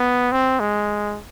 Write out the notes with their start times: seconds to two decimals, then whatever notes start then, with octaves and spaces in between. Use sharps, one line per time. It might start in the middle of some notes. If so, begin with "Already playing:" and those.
Already playing: B3
0.32 C4
0.60 G#3